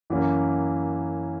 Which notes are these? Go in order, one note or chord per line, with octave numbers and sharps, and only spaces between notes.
F#2 E3 A#3 C#4